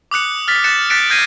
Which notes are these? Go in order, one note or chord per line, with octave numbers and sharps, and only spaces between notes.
D6 D#6 F#6 C#7
F6 A6 B6
F#6 A6 C#7 E7
F#6 A6 B6 C#7 D7
F6 G6 G#6 A#6 C7 D#7